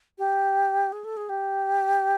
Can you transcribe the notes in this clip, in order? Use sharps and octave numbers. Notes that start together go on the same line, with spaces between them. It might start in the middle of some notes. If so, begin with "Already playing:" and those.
G4
G#4
A4
G#4
G4